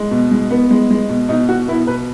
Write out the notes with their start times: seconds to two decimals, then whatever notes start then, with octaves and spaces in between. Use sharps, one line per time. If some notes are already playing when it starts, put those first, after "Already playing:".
Already playing: G#3
0.11 B2
0.31 G#3
0.51 B3
0.70 G#3
0.90 G#3
1.09 B2
1.29 B2 D#4
1.49 B2 F#4
1.67 B3 E4
1.87 B2 B4